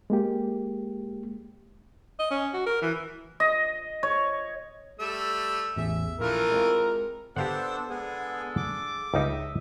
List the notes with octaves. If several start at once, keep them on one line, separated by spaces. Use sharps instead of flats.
G#3 A#3 G4
D#5
C#4
F#4
A#4
E3
D#5
C#5
G3 A3 E6
A1 E2 G#4 E5
A#1 E3 A3 F4 A#4
G#3 C4 F4
B3 C4 D4 G4 A4 C5 F5 F#5
D3 G#3 B3 G#4 A4
D6
C#2 G3 D#4 D#5 E5